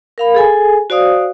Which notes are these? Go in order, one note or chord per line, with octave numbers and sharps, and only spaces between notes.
A#4 F5 B5
G#4 A4 G#5
F#4 C5 D5 F5 D#6